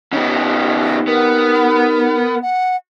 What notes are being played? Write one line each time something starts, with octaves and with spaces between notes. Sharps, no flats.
C#3 B3 D#4 G4
B3 A#4
F#5